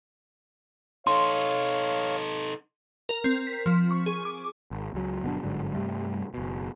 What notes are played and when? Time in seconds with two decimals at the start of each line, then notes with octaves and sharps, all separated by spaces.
1.07 D#4 A4 C#5 F5 C6
3.09 A#4
3.24 C4
3.47 B6
3.66 F3
3.91 C#6
4.06 G#4
4.25 D6
4.71 G#1
4.94 C#2 F#3
5.23 G1 B2 F#3 D4
5.43 G1 G#2 D3 F#3
5.74 G2 C3 G3 A3
6.34 F#1 B2